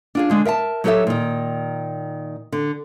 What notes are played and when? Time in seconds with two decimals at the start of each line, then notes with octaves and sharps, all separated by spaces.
0.15 D4 F4 G#4
0.30 D3 G#3 D4
0.45 A#4 E5 F5 A5
0.84 F#3 D#4 G4 A4 C#5 E5
1.07 A#2 D#3
2.52 D3